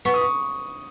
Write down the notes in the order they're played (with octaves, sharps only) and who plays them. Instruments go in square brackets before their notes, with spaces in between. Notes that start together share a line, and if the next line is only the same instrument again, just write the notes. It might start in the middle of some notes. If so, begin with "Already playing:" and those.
[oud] B3 [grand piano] C#6
[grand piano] D#6
C#6